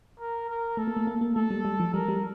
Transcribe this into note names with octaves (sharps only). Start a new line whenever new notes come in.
A#4
A#4
A3 A4
A#3
A3
A#3
A#3
A3 A4
G3
G3
F3
G3 A#4
G3